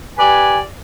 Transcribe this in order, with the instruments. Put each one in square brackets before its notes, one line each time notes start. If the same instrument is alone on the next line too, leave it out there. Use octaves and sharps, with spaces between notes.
[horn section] G4 B4 D5 G#5